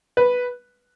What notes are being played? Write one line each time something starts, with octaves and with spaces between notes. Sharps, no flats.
B4